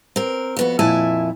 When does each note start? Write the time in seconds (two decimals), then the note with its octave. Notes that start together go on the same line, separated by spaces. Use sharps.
0.16 C4 A#4
0.57 F2 B3 F#4
0.79 F2 A#2 E4 E5 G#5 A5